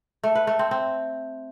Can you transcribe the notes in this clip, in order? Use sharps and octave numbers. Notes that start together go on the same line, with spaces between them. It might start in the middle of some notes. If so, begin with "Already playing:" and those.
A3
B4
A3
C4
C4